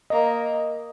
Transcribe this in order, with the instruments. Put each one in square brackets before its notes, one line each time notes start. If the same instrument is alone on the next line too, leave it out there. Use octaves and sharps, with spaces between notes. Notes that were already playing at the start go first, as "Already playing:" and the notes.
[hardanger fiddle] A#3 [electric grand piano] D#5